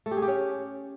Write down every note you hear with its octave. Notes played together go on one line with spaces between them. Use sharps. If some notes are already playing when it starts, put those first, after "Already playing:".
A3
G4
G#4
G4
C#4